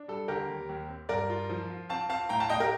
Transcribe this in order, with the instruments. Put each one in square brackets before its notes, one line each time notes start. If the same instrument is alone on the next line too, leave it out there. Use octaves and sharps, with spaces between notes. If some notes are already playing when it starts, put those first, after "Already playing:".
Already playing: [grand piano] D4
G3 A4
D3 G4 A#4
D#2
D#2
C4
G2 A#4 D5
F4
F3
F4
C4 F5 A5
C4 F5 A5
A2 G5 A#5
F5 A5
A2 D#5 G5
G4 A#4